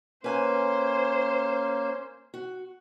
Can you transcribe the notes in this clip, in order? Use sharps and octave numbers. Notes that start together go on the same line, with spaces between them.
A#3 C#4 B4 C5 G#5
F#4